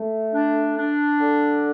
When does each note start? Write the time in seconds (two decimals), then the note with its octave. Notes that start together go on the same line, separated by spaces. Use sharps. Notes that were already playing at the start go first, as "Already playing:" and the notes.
Already playing: A3
0.34 D4
0.77 D4
1.20 D3